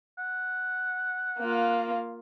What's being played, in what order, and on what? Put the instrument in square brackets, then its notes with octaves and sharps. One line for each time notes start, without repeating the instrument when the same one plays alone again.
[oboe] F#5
[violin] A#3 F4